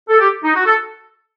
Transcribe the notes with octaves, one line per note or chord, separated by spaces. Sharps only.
A4
G4
D#4
F#4
A4